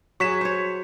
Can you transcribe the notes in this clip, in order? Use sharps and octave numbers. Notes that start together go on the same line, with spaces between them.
F#3 G#4 C#6 B6 E7
C5 C#5